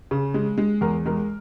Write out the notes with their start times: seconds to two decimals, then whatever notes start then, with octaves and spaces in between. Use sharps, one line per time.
0.11 C#3
0.34 G#3
0.58 G#3
0.81 E2 A#4
1.06 G#3 A#4